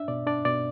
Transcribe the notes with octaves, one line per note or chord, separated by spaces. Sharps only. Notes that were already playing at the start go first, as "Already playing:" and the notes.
Already playing: D4 E5
B2 D5
D4 D5
B2 D5